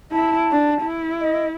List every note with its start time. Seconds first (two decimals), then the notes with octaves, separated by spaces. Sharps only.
0.13 E4 A5
0.52 D4
0.82 E4
1.21 D#5